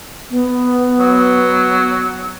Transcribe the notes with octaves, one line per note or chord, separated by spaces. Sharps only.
B3
F#3